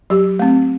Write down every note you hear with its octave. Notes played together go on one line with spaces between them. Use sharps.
F#3 G4
A3 C4